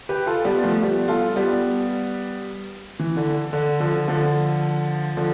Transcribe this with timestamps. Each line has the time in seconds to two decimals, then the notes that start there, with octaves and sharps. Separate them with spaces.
0.09 G4 B4
0.26 F4 A4
0.45 G3 B3
0.63 F3 A3
0.82 G3 B3
1.08 F4 A4
1.36 G3 B3
2.99 E3
3.17 D3
3.53 D3
3.80 D3 F3
4.08 D3 F3
5.17 D3 F3